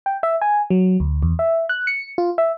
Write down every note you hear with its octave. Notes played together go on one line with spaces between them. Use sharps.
G5
E5
G#5
F#3
D2
E2
E5
F#6
C#7
F4
E5